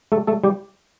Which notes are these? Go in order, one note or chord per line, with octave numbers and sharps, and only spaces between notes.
A3 A4
A3 A4
G3 G4